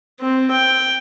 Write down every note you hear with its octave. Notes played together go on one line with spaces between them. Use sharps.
C4
G5